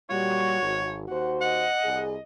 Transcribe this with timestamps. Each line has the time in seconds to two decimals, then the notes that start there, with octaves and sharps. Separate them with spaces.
0.10 A#2 G3 F#4 C#5
0.60 G#1
1.08 D#2 F#4 C5 F#5
1.41 D#5 F#5
1.84 C2 G#4